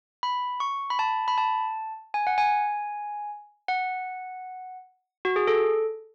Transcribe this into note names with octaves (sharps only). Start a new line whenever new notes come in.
B5
C#6
B5
A5
B5
A5
G#5
F#5
G#5
F#5
F#4
G#4
A4